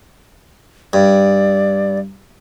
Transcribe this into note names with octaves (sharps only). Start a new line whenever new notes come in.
G2 D5